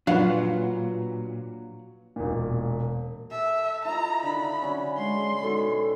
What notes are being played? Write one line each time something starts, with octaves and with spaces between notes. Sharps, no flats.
A#2 F#3 D4 F4 B4 F5 F#5
E1 A#2
A4 E5
E4 F4 D#5 A#5
D3 D#3 B5
D3 F#3 C#4
G#3 C#4 C6
B2 D#3 F#4 A4